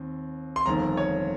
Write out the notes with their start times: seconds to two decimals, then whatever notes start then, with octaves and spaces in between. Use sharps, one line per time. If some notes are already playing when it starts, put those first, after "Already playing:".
Already playing: D#2 C4
0.56 C6
0.66 G1 F2 D#3 A#5
0.97 C#5